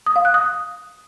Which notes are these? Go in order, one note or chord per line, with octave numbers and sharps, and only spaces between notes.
D#6
F5
F#6
D#6